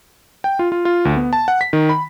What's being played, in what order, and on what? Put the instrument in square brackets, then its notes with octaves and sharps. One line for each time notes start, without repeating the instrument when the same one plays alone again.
[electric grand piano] G5
F4
F4
F4
D2
B3
A5
F#5
B6
D#3
B5